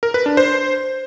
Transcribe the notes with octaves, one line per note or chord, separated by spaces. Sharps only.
A#4
B4
D4
C5